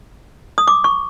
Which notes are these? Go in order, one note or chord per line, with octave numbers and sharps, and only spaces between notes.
D#6
D6
C#6